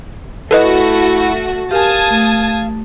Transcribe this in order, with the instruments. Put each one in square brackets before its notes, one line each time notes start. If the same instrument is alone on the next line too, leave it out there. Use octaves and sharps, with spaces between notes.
[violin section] A3 F#4 [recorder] E4 [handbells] A4 B4 D#5
[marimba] G4 A#4 G#5 [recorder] F5 [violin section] A5 D#6 G#6
[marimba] A3